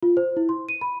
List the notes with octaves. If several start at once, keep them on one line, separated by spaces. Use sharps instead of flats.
F4
C5
E4
C6
D#7
B5